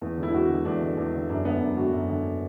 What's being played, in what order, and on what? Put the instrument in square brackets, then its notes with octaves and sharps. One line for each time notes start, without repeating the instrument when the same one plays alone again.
[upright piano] E2
D3
E4
E2 F#4
D3
E2 D4
D3
E2 D4
D3
F#2 D4
D3 B3
F#2 D4
D3 F#4
F#2
D3